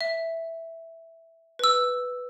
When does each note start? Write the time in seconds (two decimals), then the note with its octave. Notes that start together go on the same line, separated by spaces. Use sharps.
0.01 E5
1.59 B4 E6